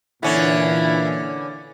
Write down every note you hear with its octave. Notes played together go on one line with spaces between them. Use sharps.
A#2 D3 E3 C#4 E4